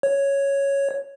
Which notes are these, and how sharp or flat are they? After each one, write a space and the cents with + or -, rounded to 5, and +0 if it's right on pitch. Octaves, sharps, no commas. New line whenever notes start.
C#5 +0